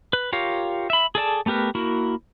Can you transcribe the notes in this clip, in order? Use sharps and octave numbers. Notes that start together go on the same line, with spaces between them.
B4
F4 G4 A#4 C#5 F5
E5 B5
G#4 A4 D5 A5
A3 B3 G4 A#4 B4
A#3 E4 F#4 A#4